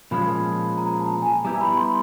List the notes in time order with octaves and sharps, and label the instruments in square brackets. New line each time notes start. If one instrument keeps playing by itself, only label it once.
[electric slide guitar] A#2 F3 G#3 C#4 [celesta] B5
[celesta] A#5
A5
G#5
[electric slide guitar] G3 B3 E4 G4 [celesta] A#5
[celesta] B5
C6